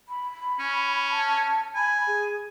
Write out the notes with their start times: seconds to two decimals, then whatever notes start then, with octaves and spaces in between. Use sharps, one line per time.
0.09 B5
0.59 C#4
1.10 A5
1.75 G#5 B5
2.07 G#4